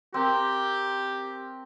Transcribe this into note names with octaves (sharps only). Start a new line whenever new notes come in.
C4 G4 A#4